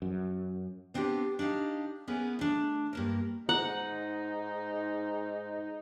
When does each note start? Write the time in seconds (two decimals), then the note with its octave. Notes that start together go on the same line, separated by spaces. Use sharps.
0.02 F#2
0.94 B3 C4 D4 F4 G4
1.39 D4 D#4 G4 F5
2.07 B3 C#4 E4 G#4 A#4 B4
2.39 A3 D4
2.93 G2 A#3 A#4
3.49 G#2 D#4 F#5 A#5